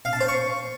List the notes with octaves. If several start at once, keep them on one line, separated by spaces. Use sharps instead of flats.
F5
A5
C5
C#6